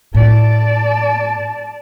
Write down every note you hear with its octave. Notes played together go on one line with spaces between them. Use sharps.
A2 D5 A5